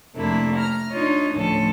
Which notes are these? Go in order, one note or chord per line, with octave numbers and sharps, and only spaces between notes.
F2 C3 A3 A#3 D4 E4
A#5 F6
D4 D#4 F4 C#5 D#5
D2 A2 F3 C#4 A4